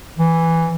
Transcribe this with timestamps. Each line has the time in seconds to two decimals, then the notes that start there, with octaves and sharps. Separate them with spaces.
0.19 E3